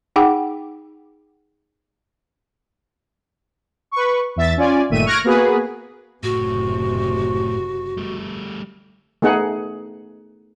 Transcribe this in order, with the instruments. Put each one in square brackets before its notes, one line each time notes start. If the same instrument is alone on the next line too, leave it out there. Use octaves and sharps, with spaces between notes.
[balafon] D#4 G#4 F#5 G5 D6
[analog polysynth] B4 C#6
E2 E5 A6
C#4 F4 D5 G#5
G1 A#2 D#3 A3 E5 D#7
C#6 F6 F#6 G#6 A#6 D7
A#3 B3 F#4 G#4 B4
[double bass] F#1 C3 [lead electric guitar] A2 [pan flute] F#4
[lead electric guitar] G3 A3
[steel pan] A3 B3 D#4 G#4 F#5